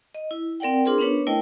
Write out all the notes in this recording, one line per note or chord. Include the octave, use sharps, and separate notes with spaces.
D#5
E4
C4 A#4 D5 F#5 G5
D4 F4 G#4 A#4 C5 C6
B3 C#4 D4 B4 C#5
A3 E4 A#4 C5 D#5 G5